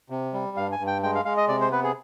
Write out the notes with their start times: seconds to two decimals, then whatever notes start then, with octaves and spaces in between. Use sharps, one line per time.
0.10 C3
0.34 G3
0.57 G2 F5
0.72 G#5
0.79 G2
0.87 G5
1.03 G#3 G5
1.15 F5
1.25 G#3 F5
1.37 D#5
1.48 C3 D5
1.61 C5
1.71 B3 B4
1.84 G#4